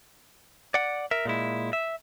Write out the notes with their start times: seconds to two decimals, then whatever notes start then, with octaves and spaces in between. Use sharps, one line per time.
0.74 D5 F#5
1.11 A#4 E5
1.25 A#2 G#3 E4
1.73 E5